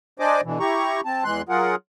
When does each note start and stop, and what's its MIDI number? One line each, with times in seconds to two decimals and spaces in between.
0.19 0.41 62
0.19 0.41 72
0.19 0.41 74
0.19 0.41 75
0.19 0.41 80
0.19 0.41 86
0.44 0.59 47
0.44 0.59 50
0.44 0.59 52
0.60 1.01 64
0.60 1.01 67
0.60 1.01 82
0.60 1.01 85
1.05 1.24 60
1.05 1.24 81
1.24 1.42 40
1.24 1.42 52
1.24 1.42 56
1.24 1.42 84
1.24 1.42 90
1.49 1.75 54
1.49 1.75 65
1.49 1.75 68
1.49 1.75 70
1.49 1.75 78